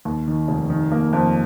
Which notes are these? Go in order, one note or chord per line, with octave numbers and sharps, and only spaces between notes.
D#2
D#3
F1
D#3
A#3
F2